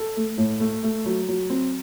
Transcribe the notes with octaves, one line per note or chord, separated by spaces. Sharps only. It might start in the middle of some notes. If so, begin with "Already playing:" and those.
Already playing: A4
A3
A2
A3
A3
F#3
F#3
C4